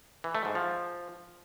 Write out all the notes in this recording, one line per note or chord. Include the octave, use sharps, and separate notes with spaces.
E3
A3
G#2
F3